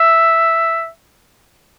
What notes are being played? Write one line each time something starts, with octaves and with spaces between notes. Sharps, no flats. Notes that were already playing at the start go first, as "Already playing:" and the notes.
Already playing: E5